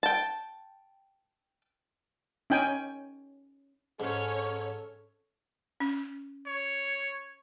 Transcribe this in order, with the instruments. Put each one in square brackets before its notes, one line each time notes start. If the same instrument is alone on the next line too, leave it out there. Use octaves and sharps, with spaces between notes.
[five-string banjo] G5 A5
[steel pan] C#4 D#4 G5 G#5
[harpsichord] G#2 [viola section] C#4 C#5 [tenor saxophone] A4
[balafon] C#4
[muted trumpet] C#5